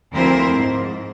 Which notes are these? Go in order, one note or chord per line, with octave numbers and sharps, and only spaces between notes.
D2 F3 C4 E4 A#4 C5
G#2